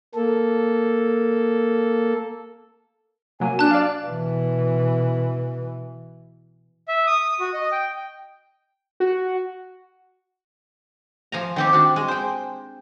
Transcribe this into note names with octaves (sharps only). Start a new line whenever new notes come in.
A#3 A4
C3 F#3 A#3 G#5
D4 A5 F#6
D5 F5
B2 E3
E5
D#6
F#4
D#5
G5
F#4
F3 G#5 A#5
D#3 C4 G4
D4 F#4
G#3
C5 G5